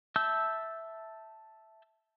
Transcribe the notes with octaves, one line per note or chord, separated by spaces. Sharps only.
E5 A5 E6 G6